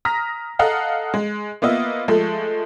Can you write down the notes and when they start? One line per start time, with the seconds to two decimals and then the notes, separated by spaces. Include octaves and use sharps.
0.05 A#5 D#6 F6 A#6 B6
0.59 A4 D#5 F5 F#5 A#5
1.14 G#3
1.62 A#3 B3 F4 D#5 E5
2.08 F3 G#3 A3 A4